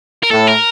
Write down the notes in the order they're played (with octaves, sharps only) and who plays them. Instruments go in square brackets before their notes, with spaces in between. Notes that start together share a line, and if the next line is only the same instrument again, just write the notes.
[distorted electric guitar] A#4
[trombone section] A2 [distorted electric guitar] A4
[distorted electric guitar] A#4